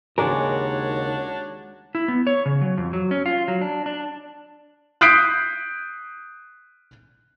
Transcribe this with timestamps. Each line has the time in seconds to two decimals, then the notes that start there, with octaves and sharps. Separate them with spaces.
0.18 D#2 C#3 G#3 D4 F#4 A#4 C#5 D5
1.95 E4
2.08 B3
2.27 C#5
2.46 C#3
2.61 F#3
2.77 F2
2.93 F#3
3.11 C#4
3.26 F4
3.48 F#3
3.61 D4
3.86 D4
5.01 D#6 F#6 G6 B6 C7 D7